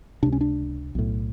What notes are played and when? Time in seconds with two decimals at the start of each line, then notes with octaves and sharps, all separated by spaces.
0.23 C#2 C3 D4
0.32 C#4
0.41 D4
0.95 B1 A2